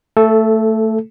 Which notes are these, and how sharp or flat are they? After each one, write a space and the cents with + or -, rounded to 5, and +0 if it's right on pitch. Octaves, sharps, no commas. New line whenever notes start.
A3 +15 A4 -10